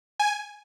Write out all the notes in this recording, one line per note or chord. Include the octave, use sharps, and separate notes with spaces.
G#5